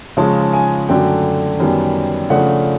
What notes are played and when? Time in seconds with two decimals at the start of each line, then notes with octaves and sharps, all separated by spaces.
0.17 C#3 F3 G#3 C#4 A5
0.40 A5
0.53 G#5
0.89 F#2 D3 F#3 A3 G5
1.60 F#2 D#3 G3 B3
2.30 C#3 F3 A3 D4 F#5